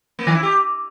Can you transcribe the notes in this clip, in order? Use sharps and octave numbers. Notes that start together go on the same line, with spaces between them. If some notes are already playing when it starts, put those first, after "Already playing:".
A#3
D#3
E4
G4